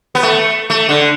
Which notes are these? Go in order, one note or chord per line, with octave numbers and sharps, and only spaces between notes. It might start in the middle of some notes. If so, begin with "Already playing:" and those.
B3
A3
A3
D3